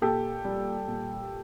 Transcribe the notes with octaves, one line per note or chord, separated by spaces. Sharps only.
A#2 G4 A4
G3
A#2